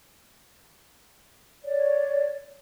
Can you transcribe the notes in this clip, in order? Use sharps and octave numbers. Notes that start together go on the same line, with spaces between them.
C#5 D5